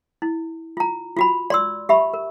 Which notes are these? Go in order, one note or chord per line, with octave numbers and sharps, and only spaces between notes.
E4
F4 A#5
F4 F#4 B5
D5 C6 E6
G4 E5 B5 C#6
A#4